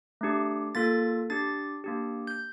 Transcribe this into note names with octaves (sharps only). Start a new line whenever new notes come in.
A3 D4 G4
A#3 F4 A4 A6
D4 G4 A6
A#3 D4 G4
G6